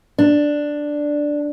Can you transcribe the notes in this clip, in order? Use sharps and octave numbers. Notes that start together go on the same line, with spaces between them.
D4